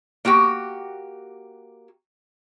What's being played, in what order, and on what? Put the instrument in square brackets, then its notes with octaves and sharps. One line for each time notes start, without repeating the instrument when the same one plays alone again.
[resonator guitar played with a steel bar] A#3 F#4 G4 G5